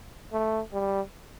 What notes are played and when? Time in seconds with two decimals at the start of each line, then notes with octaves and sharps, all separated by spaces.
0.32 A3
0.73 G3